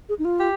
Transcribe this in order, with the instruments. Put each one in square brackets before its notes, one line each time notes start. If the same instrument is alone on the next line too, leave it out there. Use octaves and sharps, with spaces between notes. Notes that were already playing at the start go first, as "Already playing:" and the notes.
[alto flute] G#4
D#4
F4
[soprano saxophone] G4